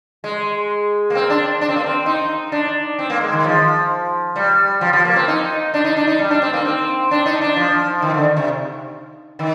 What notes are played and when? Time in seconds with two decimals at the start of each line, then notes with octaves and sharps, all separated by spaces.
0.24 G#3
1.10 A#3
1.15 C4
1.30 D4
1.61 D4
1.69 C4
1.76 A#3
1.83 C4
2.06 D#4
2.52 D4
2.99 C4
3.10 A#3
3.21 G#3
3.33 D#3
3.45 F3
4.36 G3
4.81 F3
4.93 F3
5.05 A#3
5.16 C4
5.28 D#4
5.74 D4
5.84 D#4
5.96 D4
6.07 D#4
6.19 G3
6.31 D4
6.42 C4
6.53 A#3
6.65 C4
7.11 D4
7.26 D#4
7.41 D4
7.56 F3
8.02 D#3
8.14 D3
8.37 C3
9.39 D#3